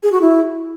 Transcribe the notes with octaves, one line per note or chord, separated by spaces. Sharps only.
G#4
F#4
E4